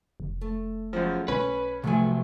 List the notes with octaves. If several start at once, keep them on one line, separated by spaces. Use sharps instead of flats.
F1
A3
F#2 C#3 F3
B1 C#4 B4
C3 F3 F#3 A3 B3 G#5